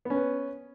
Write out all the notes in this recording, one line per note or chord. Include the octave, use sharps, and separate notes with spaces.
B3 C#4 B4